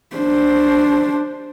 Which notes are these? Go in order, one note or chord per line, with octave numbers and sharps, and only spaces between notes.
D4 C5